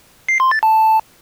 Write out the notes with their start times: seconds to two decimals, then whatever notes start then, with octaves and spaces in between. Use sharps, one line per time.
0.29 C7
0.40 C6
0.51 A6
0.63 A5